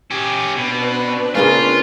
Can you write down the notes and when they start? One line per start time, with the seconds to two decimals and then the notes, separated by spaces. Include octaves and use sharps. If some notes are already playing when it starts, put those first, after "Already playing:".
0.11 C#4 G4
0.55 B2 C4 D4 B4
1.35 C#3 A#3 C#4 F4